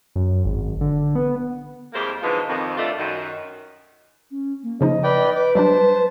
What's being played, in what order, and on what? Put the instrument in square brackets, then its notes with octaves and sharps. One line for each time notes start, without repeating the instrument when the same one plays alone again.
[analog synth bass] F#2
G#1
D3
B3
[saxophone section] F2 G3 G#3 A#3 E4 C5
B2 D3 E3 F3 G#3 D#4
F2 D#3
G2 G3 A3 F4 D5
F#2 D#3
[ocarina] C#4
A#3
[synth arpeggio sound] C#3 F3 D#4 [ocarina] D#5
[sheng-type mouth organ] B4 D5 G5
[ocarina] B4 [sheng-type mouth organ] D6
[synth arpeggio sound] F#3 G3 D4 [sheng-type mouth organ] C5 A5